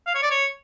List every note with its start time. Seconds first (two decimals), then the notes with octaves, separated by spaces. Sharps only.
0.07 F5
0.15 C#5
0.23 D5
0.30 C#5